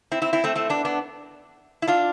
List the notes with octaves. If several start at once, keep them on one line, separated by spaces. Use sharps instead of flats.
C4 E4
C4 E4
C4 E4
A3 C4
A3 C4
B3 D4
B3 D4
E4
D4 F4